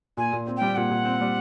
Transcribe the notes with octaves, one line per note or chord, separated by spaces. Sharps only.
A#2 G#5
A#2
C4
G3 G5
A#2 F#5
A#2
C4
G3